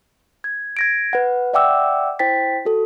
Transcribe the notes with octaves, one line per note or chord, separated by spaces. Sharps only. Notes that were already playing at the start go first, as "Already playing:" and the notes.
G#6
G#6 A#6 D7
B4 F#5
D5 E5 F#5 G5 D6 E6
E4 C5 G5 A6 B6
F#4 A4